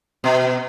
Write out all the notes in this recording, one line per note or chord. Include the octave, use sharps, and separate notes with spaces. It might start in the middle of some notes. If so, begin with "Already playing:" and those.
B2